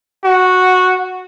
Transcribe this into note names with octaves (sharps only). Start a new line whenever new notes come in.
F#4